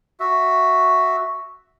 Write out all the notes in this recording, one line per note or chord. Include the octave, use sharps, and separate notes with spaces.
F#4 E5